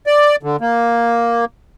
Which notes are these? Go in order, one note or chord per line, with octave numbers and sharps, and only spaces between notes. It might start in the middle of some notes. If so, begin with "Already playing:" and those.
D5
D3
A#3